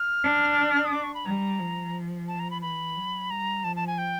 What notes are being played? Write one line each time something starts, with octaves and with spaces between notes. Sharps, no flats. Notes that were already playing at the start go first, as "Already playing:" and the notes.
Already playing: F6
D4
D#6
D6
C#6
B5
G3 A#5
F3
A5
A#5
B5
E3 B5
F#3
G3 A#5
F3 A5
A5
G#5
G5